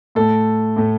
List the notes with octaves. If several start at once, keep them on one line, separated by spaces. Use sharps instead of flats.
A2 A3 A4
A2 A3